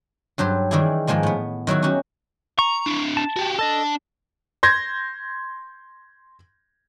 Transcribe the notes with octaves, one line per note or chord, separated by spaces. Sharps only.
G2 F#3 G4 C5
D#3 E3 G3 E4 G4 G#4
G#2 D#3 F3 G#3 A#3
A2 B3
D#3 F#3 E4 F#4
C#4 D#4 F#4 G4
A#5 C#6
D4 E4
A5
F#4 G4
D4 A4 D#5 A5
C6 G6 G#6 A#6